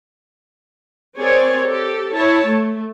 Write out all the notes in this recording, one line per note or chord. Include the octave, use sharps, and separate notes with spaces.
C4 G#4 A#4 C#5 D5
G4 A4
E4 C#5 A5
A3